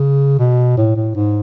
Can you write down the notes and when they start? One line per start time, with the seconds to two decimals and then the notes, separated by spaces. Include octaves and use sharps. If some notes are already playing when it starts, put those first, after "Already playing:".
Already playing: C#3
0.39 B2
0.78 A2
0.96 A2
1.16 G#2